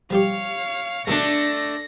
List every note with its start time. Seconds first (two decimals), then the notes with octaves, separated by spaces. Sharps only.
0.10 F3 G3 G4 C#5 F5
1.07 G#2 B2 D#3 A3 D4 A#6